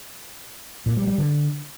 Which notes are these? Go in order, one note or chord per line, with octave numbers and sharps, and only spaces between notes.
A#2
G3
G3
D3